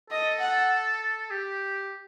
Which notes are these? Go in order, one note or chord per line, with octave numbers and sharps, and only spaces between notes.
A4 D#5
F#5
G4